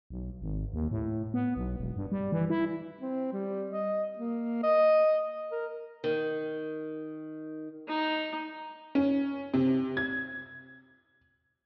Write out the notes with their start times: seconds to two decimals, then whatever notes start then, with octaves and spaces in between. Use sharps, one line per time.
0.10 B1
0.42 G#1
0.73 D#2
0.91 A2
1.34 B3
1.56 B1
1.78 E1
1.96 G2
2.12 G3
2.32 E3
2.50 E4
3.01 C4
3.32 G3
3.72 D#5
4.18 A#3
4.63 D#5
5.52 A#4
6.04 D#3
7.88 D#4
8.95 C#4
9.54 C3
9.97 G#6